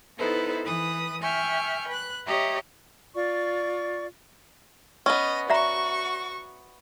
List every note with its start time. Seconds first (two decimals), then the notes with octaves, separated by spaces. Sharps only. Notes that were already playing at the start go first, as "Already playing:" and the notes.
0.18 B3 D#4 E4 A4 B4 C5
0.64 E3 B4 D#6
1.22 E5 G5 G#5 C#6 F6
1.89 B4 F#6
2.27 G4 C#5 D#5 E5 A#5
3.15 F4 D5 C#6
5.06 B3 C#4 D#5
5.50 F#4 D5 E5 A#5 C#6